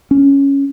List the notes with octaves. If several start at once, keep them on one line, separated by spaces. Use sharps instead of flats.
C#4